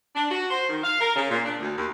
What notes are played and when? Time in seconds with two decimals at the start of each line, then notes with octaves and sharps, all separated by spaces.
0.15 D4
0.30 F#4
0.50 C5
0.69 D#3
0.83 F5
1.00 A#4
1.15 C#3
1.30 A#2
1.44 D4
1.59 D2
1.77 D#2